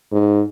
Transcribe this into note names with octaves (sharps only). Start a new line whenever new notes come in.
G#2